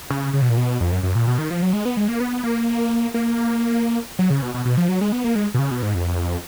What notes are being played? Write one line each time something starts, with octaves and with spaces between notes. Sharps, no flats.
C#3
C#3
B2
A#2
B2
F2
F#2
F#2
A#2
B2
D#3
F3
F#3
G#3
B3
G#3
A#3
B3
A#3
A#3
F#3
C#3
B2
B2
B2
F3
F#3
G#3
B3
A#3
G#3
B2
C#3
B2
G#2
F2